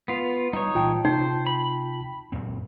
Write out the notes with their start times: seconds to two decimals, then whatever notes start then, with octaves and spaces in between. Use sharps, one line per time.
0.08 B3 F4
0.53 G3 D#4 C#5
0.75 A#2 E3 F4 G5 A5
1.05 C3 D#4 C5
1.47 B5
2.32 F#2 A#2 C4